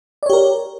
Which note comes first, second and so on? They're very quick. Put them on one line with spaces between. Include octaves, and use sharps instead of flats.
D5 C#5 G4 A#4